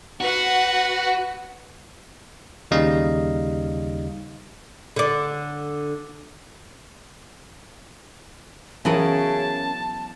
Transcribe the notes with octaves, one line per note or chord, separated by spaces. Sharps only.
F#4 B4 F#5
D#2 C#3 G3 D#4 D#5 F5
D3 D5
C#3 E3 F#3 B3 C#4 A#4 A5